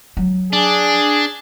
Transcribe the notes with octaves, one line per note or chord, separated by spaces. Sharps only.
F#3
D4 G#4